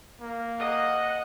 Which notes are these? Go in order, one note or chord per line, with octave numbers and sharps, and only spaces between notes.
A#3
D#5 F#5